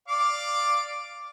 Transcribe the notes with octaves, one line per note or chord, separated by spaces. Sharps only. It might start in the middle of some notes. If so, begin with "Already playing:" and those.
D5 F5 D6